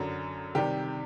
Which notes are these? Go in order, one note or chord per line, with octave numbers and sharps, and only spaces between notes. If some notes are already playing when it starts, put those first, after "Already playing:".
Already playing: F#2 D3 F#3
C3 D#3 G3 G4